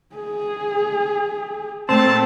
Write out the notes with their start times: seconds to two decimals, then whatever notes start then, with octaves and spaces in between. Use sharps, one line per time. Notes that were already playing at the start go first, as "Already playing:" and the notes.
0.16 G#4
1.89 A#2 A3 C4 A5